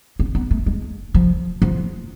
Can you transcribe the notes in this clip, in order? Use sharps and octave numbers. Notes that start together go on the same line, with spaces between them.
C4
B3
A3
G#3
F3
F3